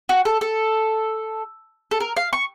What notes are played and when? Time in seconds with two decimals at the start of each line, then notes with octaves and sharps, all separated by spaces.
0.09 F#4
0.25 A4
0.41 A4
1.91 A4
2.00 A#4
2.17 F5
2.33 C#6